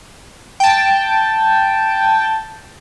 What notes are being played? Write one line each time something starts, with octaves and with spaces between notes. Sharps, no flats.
G5 A5